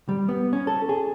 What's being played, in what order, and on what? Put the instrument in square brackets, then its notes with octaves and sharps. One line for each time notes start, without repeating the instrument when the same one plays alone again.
[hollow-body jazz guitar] G3
B3
C#4
A4
G#4